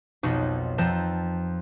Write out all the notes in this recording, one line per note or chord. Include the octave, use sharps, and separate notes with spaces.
B1 F2 F#3 D#4 C#5
F2 F3 A4 G5 A#5 E7